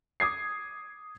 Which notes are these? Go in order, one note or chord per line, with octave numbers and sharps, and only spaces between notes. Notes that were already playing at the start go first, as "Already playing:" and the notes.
D6 D#6 G#6 C7